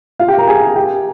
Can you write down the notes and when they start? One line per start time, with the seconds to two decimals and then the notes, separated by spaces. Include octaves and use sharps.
0.19 F4 F5
0.28 G4 G5
0.38 A#4 A#5
0.48 G#4 G#5
0.76 G4 G5